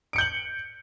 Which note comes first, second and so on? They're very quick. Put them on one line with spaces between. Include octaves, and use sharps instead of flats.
D7 C#7 G6 F#7